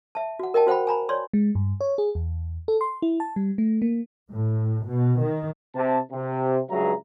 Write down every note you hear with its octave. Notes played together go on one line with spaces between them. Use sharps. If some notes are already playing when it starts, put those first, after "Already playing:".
E5 A5
F#4 F#5
A#4 D#5 G5 A5
F#4 C5 F#5 G5 B5
G#5 A#5 B5
C#5 D5 C6
G#3
G2
C#5
G#4
E2
A4
C6
E4
A5
G3
A3
A#3
A2
B2
D#3
C3 A5
C3
C#2 G2 F#3 G#4 E5 A#5